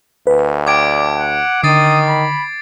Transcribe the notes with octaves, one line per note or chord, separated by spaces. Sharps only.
D2 B4
D5 G5 A5 D6 G#6 D7
F#5
D3 D#3 D#6 A6 C7
B5